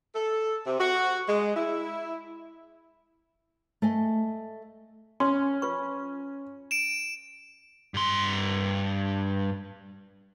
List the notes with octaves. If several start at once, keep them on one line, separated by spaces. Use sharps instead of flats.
A4
C3
F#4
G#3
E4
A3 D#5 G#5
C#4 C6
F4 B4 C#6
D7 E7
G2 C6